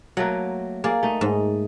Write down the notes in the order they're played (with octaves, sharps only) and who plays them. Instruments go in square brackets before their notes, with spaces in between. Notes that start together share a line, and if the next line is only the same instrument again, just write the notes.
[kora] F#3 A3 A#3 [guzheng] F#5
[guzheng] A#3 [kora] G#4 D5
[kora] A3 D#4
[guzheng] G#2